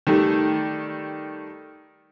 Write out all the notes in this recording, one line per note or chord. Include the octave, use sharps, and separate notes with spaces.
D#3 G3 A3